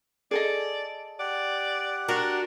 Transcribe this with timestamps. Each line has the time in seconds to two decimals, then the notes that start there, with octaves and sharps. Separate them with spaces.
0.31 G#4 A4 D5 D#5
1.19 G4 D5 F#5
2.08 D4 F#4 A#4